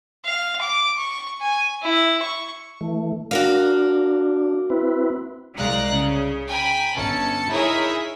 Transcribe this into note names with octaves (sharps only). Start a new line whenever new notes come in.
F5
D6
C#6
G#5
E4
C#6
E3 A3
D4 F#4 A#4 F5
C4 E4 B4
C2 G#3 D5 F5 A#5 F#6
C#3
G5 G#5 A#5 B5
G1 C#4 A4 A5 C#7
D#4 E4 G#4 A#4 C#5 E5